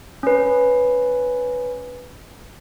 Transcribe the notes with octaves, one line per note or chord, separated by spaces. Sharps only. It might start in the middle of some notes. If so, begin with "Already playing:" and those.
C#4 B4